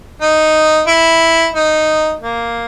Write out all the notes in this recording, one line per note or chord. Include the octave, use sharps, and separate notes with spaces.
D#4
E4
D#4
A#3